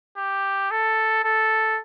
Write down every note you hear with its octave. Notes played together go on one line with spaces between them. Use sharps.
G4
A4
A4